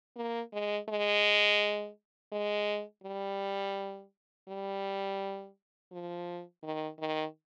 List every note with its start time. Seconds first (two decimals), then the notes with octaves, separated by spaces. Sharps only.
0.16 A#3
0.53 G#3
0.89 G#3
2.32 G#3
3.03 G3
4.48 G3
5.92 F3
6.63 D#3
6.99 D#3